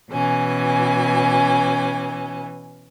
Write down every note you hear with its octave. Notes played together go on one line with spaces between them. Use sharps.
B2 E3 C#4 G#5